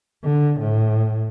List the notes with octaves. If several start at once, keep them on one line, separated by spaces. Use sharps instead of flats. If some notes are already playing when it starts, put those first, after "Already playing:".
D3
A2